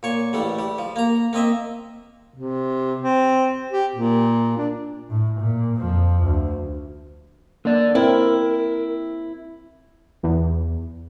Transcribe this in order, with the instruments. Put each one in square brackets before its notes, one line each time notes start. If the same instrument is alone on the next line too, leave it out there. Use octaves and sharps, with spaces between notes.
[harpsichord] A#2 C#5 C#6
A1 G3 A3
G3
F3
A#3 A#5
A#3 C4 D#5 E5
[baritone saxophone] C3
C4
G4
A#2
D4
[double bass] A2
A#2
F2 F3
D2
[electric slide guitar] D3 D5 [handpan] A#3
[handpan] C4 [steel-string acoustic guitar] E4 [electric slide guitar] A#4
[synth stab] E2